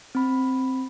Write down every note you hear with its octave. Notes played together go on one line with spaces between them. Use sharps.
C4 B5